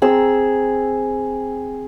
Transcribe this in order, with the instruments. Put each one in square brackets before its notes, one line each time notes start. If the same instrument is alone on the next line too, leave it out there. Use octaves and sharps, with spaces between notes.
[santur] C4 G#4 A#5 E6